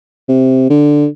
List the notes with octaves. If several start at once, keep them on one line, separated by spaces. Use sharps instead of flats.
C3
D3